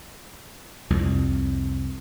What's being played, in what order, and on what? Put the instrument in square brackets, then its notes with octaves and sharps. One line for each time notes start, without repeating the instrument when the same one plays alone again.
[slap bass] C2 F2